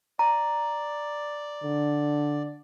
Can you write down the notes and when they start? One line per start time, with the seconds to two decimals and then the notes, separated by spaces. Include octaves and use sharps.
0.19 D5 A#5
1.64 D3